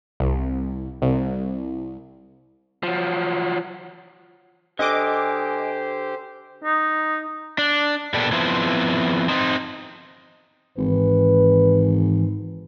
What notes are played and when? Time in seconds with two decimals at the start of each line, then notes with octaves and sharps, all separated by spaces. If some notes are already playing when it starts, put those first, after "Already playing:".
0.20 C2
1.02 C2
2.83 F3 F#3
4.79 D3 G4 C5 D#5 G#5 D6
6.64 D#4
7.58 D4
8.14 A#2 B3 D4 G4 A4
8.32 F3 B3 C4 E4
9.28 C4 D#4
10.78 G#1 G#2 E3 B4